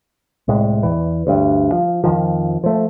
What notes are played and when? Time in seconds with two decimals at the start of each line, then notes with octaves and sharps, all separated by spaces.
0.48 C2 A2 G#3
0.83 E2 E3
1.27 D2 G2
1.72 F3
2.04 F2 D#3 F3
2.64 F3 A3